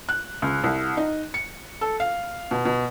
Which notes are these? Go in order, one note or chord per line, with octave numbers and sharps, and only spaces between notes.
F#6
C#2
C2
D#4
C#7
A4
F5
B2
B2